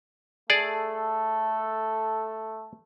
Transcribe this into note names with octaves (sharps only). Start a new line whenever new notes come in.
A3 G#4 A4 D5